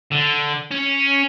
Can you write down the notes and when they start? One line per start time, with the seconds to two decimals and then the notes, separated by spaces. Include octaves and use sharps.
0.12 D3
0.71 C#4